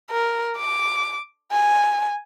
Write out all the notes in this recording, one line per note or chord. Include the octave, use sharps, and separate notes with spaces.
A#4
D6
G#5